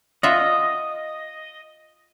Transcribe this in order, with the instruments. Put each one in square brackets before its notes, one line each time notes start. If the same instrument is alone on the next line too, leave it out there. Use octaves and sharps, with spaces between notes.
[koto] F4 E5 F#5 [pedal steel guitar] D#5